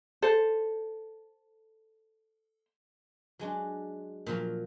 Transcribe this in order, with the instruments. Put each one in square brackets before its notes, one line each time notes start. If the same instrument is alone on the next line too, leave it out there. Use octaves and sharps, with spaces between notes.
[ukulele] A4 C5
[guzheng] F#3 G#3 D4
A#2 F3 F#3